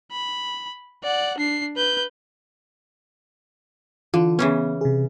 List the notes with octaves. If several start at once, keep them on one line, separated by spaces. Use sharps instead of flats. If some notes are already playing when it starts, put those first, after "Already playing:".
B5
D5 F#5
D4 C7
B4 G6
D3 E3 F4
C#3 E3 B3 C#4
C3 G#4